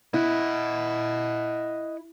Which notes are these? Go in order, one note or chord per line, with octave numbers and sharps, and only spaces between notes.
E4 D#5 F#5